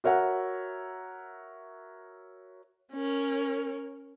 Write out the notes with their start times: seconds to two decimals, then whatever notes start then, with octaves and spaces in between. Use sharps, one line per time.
0.04 F#4 A#4 C#5 E5 F#5
2.93 C#4 A#4